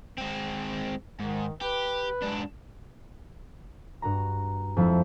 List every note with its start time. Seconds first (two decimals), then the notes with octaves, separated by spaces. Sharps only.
0.18 G#3 C4
1.19 G#2 D#3
1.61 G4 B4
2.22 G#2 D4
4.02 G2 F#4 A#5
4.77 F2 F3 G#3 E4